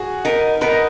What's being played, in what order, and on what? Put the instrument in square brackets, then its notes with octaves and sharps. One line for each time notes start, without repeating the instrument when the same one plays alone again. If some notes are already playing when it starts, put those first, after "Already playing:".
Already playing: [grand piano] F#4 G#4
[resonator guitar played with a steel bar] B3 D#4 A#4
[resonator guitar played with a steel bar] B3 D#4 A#4 [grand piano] B4
[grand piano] D#5